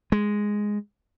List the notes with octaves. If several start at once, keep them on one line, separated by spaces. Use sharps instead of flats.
G#3